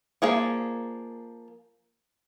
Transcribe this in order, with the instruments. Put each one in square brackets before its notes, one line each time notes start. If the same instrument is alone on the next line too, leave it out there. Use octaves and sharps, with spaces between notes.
[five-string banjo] F3 A#3 G#4 D5